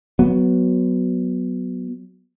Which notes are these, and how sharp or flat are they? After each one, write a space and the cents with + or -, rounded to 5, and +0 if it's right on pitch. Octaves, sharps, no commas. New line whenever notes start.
F#3 +0 B3 +0